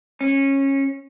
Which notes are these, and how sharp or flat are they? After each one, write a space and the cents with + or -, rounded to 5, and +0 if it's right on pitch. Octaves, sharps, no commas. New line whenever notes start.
C#4 -20